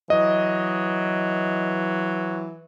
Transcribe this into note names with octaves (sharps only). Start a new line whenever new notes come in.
E3 F#3 D#5